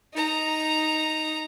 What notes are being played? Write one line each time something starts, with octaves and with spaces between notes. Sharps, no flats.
D#4 A#5